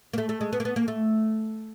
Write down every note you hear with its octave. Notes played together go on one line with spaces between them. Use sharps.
A#3
A3
A3
G#3
B3
A#3
B3
A#3
A3